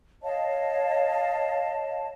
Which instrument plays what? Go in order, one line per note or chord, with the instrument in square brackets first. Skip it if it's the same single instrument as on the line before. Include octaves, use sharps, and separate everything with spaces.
[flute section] C#5 D#5 F5 A5